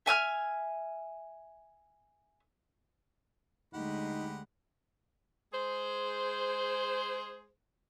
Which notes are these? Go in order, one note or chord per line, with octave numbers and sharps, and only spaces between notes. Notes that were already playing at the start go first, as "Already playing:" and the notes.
E5 G#5 E6 F6
D2 G#3 D#4 G4 F#5 B5
G#3 G#4 C5